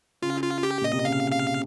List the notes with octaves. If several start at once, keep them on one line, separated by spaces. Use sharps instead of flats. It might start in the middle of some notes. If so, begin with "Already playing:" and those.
C#3 F4
F4
G4
A#2 D#5
C3
C#3 F5
F5